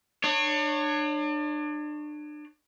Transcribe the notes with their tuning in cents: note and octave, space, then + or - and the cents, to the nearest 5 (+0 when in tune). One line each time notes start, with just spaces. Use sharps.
D4 +35 C#5 +0